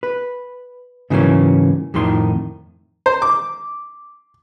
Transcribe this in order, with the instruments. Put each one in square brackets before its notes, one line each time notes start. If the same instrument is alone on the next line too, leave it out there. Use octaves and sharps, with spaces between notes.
[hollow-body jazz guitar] B4
G#2 C#3 E3 F#3 A#3 C#4
F2 A2 D#3 C6
[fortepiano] C5
D6